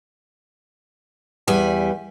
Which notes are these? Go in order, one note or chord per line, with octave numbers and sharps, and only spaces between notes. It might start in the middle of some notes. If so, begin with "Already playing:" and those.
E2 G3 B4 G#5